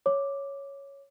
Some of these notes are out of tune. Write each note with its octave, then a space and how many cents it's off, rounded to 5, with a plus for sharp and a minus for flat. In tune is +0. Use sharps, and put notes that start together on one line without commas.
C#5 +0 D6 +0